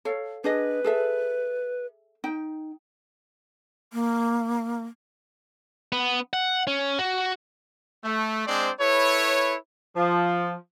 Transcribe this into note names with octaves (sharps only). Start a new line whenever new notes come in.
A4 C#5 F5
D4 G#4 B4 D#5
G#4 A4 E5
D#4 G5
A#3
B3
F#5
C#4
F#4
A3
G#3 C4 D4 C5 D5
E4 A4 B4 C#5
F3